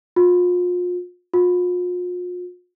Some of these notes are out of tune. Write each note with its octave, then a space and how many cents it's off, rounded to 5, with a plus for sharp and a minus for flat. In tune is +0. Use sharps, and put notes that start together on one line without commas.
F4 +35
F4 +40